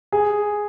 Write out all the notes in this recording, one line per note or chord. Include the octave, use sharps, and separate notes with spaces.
G#4